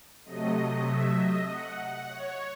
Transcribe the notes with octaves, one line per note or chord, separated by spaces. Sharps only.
C3 F#3 A3 D#5
E5
D#5
F#5
C#5